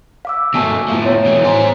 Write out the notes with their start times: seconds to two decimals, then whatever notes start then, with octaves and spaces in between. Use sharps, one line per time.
0.25 F5 D6 E6
0.55 B2 A3 G#5 A5 C#6
0.89 A2 F3 E5
1.04 B3 C#5
1.25 B2 E3
1.45 G#4 C5